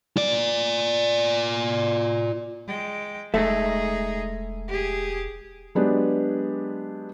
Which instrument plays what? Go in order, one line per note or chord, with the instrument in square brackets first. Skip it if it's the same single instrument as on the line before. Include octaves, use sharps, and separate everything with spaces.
[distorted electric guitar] F4 D5
[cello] G#3 G5
[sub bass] E1 [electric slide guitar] G#3 A4 E5 [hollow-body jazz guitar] A3 [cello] D#4 G#4
[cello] G4 G#4
[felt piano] F#3 G#3 B3 D4 G4 G#4